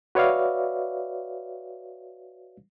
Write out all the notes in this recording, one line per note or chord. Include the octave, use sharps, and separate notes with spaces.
F#4 B4 C#5 D5 E5 F5